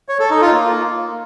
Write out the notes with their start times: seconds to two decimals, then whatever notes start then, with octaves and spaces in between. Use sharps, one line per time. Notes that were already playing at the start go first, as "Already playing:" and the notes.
0.09 C#5
0.20 A4
0.31 D#4
0.41 F4
0.52 A#3